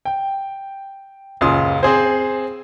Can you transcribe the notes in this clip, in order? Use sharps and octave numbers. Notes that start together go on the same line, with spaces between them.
G5
D#1 C#2 F#2 F4 C6 D#6
C4 G#4 C5